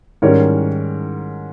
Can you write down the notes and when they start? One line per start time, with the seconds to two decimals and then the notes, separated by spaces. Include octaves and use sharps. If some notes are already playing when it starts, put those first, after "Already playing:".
0.22 G#2 D#3 G3 C#4 A#4 C#5